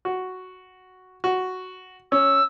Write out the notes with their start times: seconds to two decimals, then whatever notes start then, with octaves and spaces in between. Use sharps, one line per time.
0.05 F#4
1.24 F#4
2.12 C#4 E6